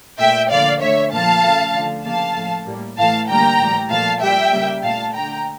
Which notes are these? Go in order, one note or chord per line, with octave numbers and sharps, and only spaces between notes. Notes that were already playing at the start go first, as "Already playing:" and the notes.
A#2 A3 E5 G5
D3 F3 A#3 D5 F5
D3 A3 C#5 E5
A#2 F3 A#3 F5 A5
C#3 F3 A3
D3 F3 A3
C#3 F3 A#3 F5 A5
A2 F3 A3
A2 G3 A#3
A2 E3 A3 F5 A5
D3 G3 A#3 G5 A#5
A2 E3 G3
A#2 F3 A3 F5 A5
A#2 G3 A#3 E5 G5
C#3 G3 A#3
A#2 A3 F5 A5
D3 A3 G5 A#5